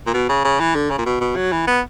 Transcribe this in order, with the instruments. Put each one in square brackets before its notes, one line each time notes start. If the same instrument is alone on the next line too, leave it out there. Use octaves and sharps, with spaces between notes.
[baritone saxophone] A#2
B2
C#3
C#3
E3
D3
C#3
A#2
B2
B2
F#3
E3
B3